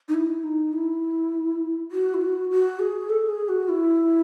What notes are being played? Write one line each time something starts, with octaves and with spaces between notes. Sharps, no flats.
D#4
E4
D#4
E4
F#4
E4
F#4
F#4
G#4
A4
G#4
F#4
E4